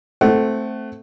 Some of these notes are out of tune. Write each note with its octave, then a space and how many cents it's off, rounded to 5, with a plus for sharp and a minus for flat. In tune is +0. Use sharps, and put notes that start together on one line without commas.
A3 +0 C4 +0 F#5 +30